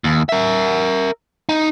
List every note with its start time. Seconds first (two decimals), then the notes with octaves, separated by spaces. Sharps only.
0.04 D#2
0.29 A#4 E5
1.49 D#4